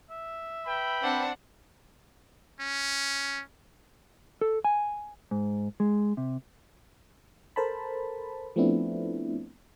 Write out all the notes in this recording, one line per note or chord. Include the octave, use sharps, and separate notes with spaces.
E5
B4 G5 B5
C4 D4 F#5
C#4
A4
G#5
G#2
G#3
C3
A4 A#4 C5 A5 B5
F3 A3 B3 C4 D4 E4